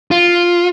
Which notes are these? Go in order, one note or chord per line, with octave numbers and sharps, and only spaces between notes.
F4